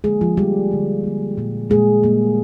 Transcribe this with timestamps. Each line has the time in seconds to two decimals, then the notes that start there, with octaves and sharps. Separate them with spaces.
0.04 D3 F3 G#3 A#3 G#4
0.21 F3 F4
0.37 D3 F3 G3 A#3 G4
0.71 D3 F3 A#3
1.04 D3 F3 A#3
1.38 A#2 G3 A#3
1.70 A#2 G3 G#3 A#3 G#4
2.03 A#2 G3 A#3